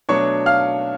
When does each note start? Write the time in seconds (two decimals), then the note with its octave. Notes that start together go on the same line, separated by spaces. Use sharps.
0.09 B2 F#3 A3 D4 C#5 C#6
0.46 F5 F6